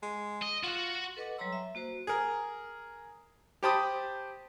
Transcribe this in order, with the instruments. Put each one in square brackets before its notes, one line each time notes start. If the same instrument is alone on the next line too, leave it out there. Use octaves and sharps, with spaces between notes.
[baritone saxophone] G#3
[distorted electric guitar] D#5
[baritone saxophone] F4 [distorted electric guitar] F#4 F#5
[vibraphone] A4 B4 D#5 F#5 D6
F#3 G3 C#5 A#5 C6 E6
E5
A#3 F#4 C5
[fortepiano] G#4 A#4
G4 C5 G5 A5 B5 D#6